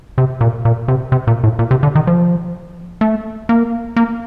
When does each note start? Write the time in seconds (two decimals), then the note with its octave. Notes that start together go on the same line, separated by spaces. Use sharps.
0.18 C3
0.41 A#2
0.65 A#2
0.88 C3
1.12 C3
1.27 A#2
1.44 A2
1.59 A#2
1.71 C3
1.83 D3
1.95 D#3
2.07 F3
3.01 A3
3.49 A#3
3.96 A#3